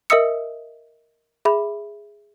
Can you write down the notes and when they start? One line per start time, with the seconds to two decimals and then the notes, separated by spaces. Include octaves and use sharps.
0.10 A#4 D#5 E5 D#6 E6 C#7
1.45 G#4 E5 B5